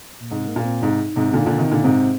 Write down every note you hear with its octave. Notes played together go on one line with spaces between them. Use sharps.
A#2
G#2 C3
A#3
A#2
C4
G#2 C3 D#4
G#2 C3
A#2 D3 D#4
A#2 D3 F4
C3 D#3
A#2 D3 D#4
G#2 C3 C4